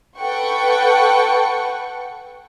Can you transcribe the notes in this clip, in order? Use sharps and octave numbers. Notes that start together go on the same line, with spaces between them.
A4 B4 F#5 G5 C#6